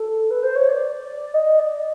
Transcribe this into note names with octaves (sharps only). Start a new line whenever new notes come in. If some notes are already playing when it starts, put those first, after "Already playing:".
Already playing: A4
B4
C5
C#5
D5
D#5
D5